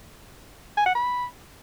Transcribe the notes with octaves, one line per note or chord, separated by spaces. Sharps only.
G#5
F#5
B5